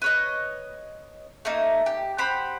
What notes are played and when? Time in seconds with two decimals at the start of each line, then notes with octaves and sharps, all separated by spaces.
0.02 B4 C#5 D#5
1.45 A3 A#3 D#4
1.86 G4
2.18 G4 C5 F#5 B5